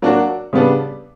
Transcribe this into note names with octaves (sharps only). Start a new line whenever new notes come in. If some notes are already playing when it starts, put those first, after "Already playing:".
F#3 A#3 D4 F#4
C#3 G3 B3 D4